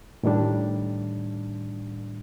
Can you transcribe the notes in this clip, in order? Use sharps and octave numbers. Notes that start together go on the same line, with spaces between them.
A2 D#3 G3 D4